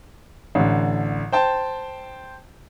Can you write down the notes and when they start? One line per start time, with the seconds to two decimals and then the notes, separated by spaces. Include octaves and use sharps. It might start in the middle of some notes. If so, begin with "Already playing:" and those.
0.55 A1 D3
1.32 C5 G5 A5